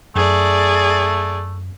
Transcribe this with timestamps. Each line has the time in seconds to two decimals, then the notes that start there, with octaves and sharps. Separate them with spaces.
0.16 F#2 A3 G#4 D5